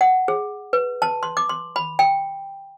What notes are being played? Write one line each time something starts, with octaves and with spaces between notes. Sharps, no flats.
F#5
G#4
B4
A5
C6
D6
C6
B5
G5